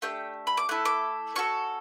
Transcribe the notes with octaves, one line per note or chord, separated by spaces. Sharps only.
A3 D4 G4 G5
B5
D6
A3 E4 A4 F#6
D6
C#4 F#4 A4 C#6